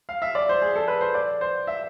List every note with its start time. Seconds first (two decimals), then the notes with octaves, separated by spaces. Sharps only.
0.09 F5
0.22 E5
0.35 D5
0.49 C5
0.62 G#4
0.76 A4
0.88 B4
1.01 C5
1.14 D5
1.41 C5
1.67 E5